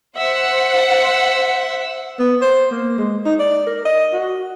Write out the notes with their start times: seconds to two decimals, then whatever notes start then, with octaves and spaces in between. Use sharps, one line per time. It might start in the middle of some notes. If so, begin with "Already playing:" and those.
0.18 C5 E5 F#5
2.19 B3
2.42 C5
2.71 A#3
2.98 G#3
3.26 D#4
3.39 D5
3.67 A#4
3.85 D#5
4.13 F#4